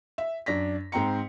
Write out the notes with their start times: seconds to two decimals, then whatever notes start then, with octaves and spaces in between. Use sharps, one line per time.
0.18 E5
0.46 F#2 D4 A#6 B6
0.92 G#2 C4 G5 A#5 C#7